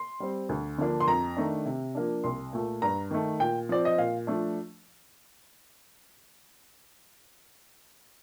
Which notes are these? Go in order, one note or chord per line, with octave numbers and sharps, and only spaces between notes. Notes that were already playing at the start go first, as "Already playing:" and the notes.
Already playing: C6
G3 C4
D2
D3 F3 A#3 D4
C6
F2 A#5
D#3 A3 D4
C3
F3 A#3 D4
C2 C6
A#2 A3
G2 A#5
D#3 A3
A#2 G5
F3 C4 D5
D#5
A#2 F5
F3 A3 D4